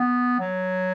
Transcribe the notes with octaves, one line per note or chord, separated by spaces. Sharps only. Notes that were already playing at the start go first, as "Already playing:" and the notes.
Already playing: B3
F#3